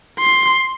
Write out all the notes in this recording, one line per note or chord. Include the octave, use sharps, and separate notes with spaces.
C6